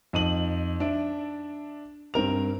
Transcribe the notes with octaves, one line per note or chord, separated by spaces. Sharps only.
F2 D#4 D#7 F#7
D4 E5 D7
G2 C4 A#4 F7